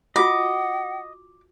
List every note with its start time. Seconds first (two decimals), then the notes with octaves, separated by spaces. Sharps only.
0.16 F4 F#4 D#5 F#5 D6